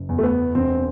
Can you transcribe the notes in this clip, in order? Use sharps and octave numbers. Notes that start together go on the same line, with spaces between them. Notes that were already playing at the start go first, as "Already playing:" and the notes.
Already playing: F#1
E2
A3
B3
E1 C4